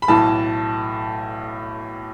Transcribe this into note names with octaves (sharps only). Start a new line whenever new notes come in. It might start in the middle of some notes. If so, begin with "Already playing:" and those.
B5
B1 A2 E3 A5